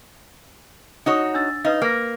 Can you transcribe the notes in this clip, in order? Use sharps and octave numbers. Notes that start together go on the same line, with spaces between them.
D#4 F#4 C#5
D4 E6 A6
D#4 B4 D#5 F5
A#3 B4 A#6